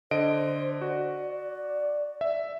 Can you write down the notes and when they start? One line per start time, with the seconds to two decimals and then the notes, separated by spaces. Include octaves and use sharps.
0.11 D3 C5 D#5 D7
0.81 F#4 D5
2.21 E5